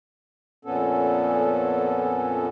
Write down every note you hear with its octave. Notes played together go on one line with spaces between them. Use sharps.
F2 A#2 B3 C#4 A4